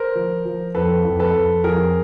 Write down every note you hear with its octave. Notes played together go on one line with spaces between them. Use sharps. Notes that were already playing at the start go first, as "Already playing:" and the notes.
Already playing: A#4 C5
F3
F3
F2 A4 B4
F2
A4 B4
F2
F2 G#4 A#4